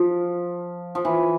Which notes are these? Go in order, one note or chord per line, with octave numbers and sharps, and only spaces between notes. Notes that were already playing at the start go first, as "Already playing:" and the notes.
Already playing: F3
F3
E3